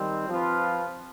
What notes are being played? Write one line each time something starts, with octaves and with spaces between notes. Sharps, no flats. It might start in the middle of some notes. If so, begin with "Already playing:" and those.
Already playing: D#3 G3 C4
F3 C4 F4 B4